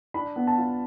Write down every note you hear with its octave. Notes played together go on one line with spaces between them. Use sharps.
D4 B5
B3
A5
F4